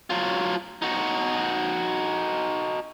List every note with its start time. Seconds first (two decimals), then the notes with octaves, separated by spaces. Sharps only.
0.10 F#3 F4
0.82 D#4 F#4